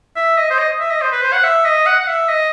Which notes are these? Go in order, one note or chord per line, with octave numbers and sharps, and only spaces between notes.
E5
D#5
C5
D#5
E5
D#5
C5
B4
C5
F#5
E5
D#5
F#5
F#5
E5
D#5